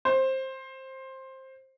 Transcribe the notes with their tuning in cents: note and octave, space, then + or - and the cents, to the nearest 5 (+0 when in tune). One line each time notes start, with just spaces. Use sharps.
C5 +15